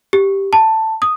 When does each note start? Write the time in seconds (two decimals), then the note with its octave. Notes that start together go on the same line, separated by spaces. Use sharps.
0.13 G4
0.53 A5
1.02 D#6